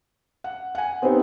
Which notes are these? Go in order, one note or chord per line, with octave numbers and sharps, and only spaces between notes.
F#5
F#5 G#5
B3 C4 D#4 G4 C5